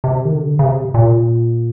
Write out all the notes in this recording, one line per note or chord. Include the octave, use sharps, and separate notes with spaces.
C3
D#3
D3
C#3
C3
A#2